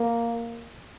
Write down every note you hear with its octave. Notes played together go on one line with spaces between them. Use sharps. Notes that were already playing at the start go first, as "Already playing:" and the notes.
Already playing: A#3